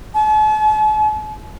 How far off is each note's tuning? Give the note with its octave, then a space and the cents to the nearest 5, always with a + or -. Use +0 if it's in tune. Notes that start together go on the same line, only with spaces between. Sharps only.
A5 -45